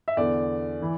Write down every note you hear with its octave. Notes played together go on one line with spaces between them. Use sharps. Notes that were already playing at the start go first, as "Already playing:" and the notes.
E5
E2 D3 D5
E3